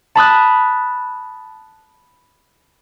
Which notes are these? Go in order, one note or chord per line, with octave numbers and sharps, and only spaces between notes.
A5 B5 D#6 F#6